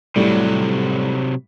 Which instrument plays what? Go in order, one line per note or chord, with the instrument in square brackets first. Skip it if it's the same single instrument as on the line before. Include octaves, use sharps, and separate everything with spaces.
[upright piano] A2 G3 A3 [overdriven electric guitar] C3 F#3